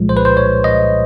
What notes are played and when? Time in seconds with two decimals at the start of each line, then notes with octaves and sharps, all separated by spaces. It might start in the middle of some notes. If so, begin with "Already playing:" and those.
Already playing: C2 A#2 F3 G#3
0.09 C5
0.17 B4
0.25 C5
0.37 C#5
0.64 D#5